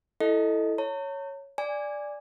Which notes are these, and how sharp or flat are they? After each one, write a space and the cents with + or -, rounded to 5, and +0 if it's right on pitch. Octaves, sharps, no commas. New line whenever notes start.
E4 +0 A4 +0 D#5 +0
C#5 +0 A#5 -45
D5 +0 G#5 -15